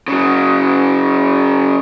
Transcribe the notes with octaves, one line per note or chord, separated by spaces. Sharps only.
C#3 F#3